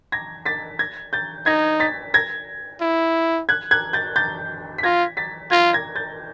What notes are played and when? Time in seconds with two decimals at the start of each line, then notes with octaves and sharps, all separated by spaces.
0.12 G#6 A#6
0.45 A6 B6
0.79 G#6 A#6
1.13 G6 A6
1.46 D#4 G#6 A#6
1.80 A6 B6
2.14 G#6 A#6
2.81 E4
3.49 F#6 G#6
3.71 F#6 G#6
3.93 G6 A6
4.16 G6 A6
4.78 B6
4.83 F4 G#6 A#6
5.17 A6 B6
5.51 F4 G#6 A#6
5.73 G#6 A#6
5.96 G6 A6